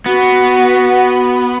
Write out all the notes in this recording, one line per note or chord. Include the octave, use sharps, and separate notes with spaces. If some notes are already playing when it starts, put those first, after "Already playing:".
B3 F#4